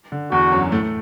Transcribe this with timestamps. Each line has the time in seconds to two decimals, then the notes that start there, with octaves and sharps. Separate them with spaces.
0.12 D3
0.32 E2 E3 F#4
0.52 F#2 F#3
0.72 A2 A3
0.82 A3